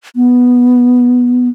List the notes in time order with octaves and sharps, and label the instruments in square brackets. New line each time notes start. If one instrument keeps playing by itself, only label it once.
[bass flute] B3